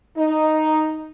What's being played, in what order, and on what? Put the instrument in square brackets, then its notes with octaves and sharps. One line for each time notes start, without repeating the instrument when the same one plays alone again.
[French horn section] D#4